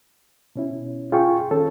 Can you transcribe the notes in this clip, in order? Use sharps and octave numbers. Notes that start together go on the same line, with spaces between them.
B2 C#4 E4
F4 G#4 G5 C#6
D#3 C#4 A4